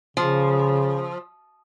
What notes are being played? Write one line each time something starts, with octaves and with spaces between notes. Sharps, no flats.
C#3 F3